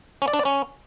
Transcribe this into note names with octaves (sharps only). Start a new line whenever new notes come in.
C#4
D5
D4
D5
C#4